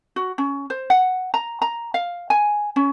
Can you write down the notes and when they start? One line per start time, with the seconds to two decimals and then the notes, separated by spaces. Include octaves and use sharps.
0.16 F#4
0.38 C#4
0.70 C5
0.90 F#5
1.34 A#5
1.62 A#5
1.94 F5
2.30 G#5
2.76 C#4